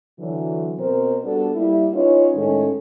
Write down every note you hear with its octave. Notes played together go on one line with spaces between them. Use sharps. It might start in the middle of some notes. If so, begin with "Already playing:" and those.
D3 E3 F#3
B2 C4 A#4 C5
G3 B3 D4 F#4 A4
G3 A#3 E4
C#4 D#4 F4 B4 C#5
A2 D#3 G#3 C#4 A4